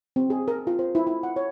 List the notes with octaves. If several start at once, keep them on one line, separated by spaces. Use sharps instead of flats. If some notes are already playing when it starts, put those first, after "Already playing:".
C4
G#4
A#4
F4
C5
E4
E4
F#5
C#5